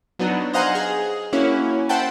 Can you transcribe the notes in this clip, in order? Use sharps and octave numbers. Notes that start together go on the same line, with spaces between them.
F#3 B3 D4 D#4
C5 D#5 F5 F#5 G#5 A#5
G#4
A#3 C#4 E4 F#4
C5 E5 F#5 G5 A5